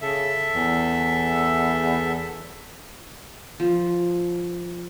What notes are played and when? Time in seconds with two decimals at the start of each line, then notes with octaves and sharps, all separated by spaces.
0.01 C#3 A4 E5
0.55 E2
3.60 F3